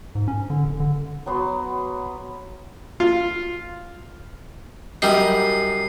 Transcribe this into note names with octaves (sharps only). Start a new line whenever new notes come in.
G#2
C#4
D3
D1
D3
F#3 B3 C6
F4
F#2 G3 D#4 C7